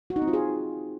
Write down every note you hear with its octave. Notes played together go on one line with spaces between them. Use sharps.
F#4
D#4
C4
F4
G#4